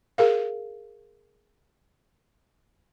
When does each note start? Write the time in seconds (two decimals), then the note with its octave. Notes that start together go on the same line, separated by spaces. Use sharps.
0.18 G#4 A#4 F5